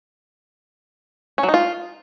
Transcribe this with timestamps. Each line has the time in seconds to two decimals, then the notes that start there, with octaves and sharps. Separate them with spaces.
1.38 C#4
1.43 F#3
1.49 D#4
1.54 F4